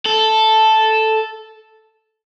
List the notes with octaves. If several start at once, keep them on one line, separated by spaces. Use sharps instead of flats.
A4